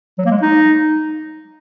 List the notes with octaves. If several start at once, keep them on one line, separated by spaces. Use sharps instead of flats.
F#3
A#3
G#3
D#4